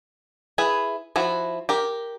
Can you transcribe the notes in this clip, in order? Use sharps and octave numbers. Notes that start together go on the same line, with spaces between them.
E4 G#4 B4
F3 E4 F#4
G4 A#4